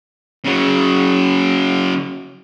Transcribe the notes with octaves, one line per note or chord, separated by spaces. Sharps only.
C#3 F#3